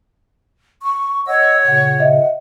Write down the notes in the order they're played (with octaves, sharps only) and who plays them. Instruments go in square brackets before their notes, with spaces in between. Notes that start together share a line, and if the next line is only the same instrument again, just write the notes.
[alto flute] C#6
[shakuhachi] C#5 [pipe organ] D#5 E6 [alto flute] F#5
[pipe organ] A#2 C#3 [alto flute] F#5
[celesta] D#5 E5